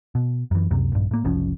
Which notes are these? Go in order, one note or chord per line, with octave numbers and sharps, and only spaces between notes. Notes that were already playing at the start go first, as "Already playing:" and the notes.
B2
F#2 E3
C#2 F#2 C3
A#1 G2
A2 A#3
F#1 C2 F3 C#4